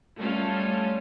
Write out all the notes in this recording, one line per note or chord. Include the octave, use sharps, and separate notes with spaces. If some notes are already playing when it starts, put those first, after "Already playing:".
G3 A3 C#4 F4 A4 F5